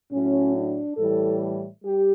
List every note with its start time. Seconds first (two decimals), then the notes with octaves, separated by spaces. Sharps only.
0.11 A2 F#3 C#4
0.55 D4
0.98 A2 E3 G3 A4
1.84 G3 G4